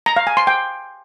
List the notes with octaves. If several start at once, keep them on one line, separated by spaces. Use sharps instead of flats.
A#5
F5
G#5
C6
G5